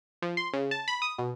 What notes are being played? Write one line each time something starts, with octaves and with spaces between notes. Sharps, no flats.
F3
C6
C#3
A5
B5
D#6
B2